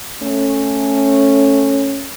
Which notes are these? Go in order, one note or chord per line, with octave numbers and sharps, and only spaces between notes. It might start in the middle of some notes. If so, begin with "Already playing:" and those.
A3 C#4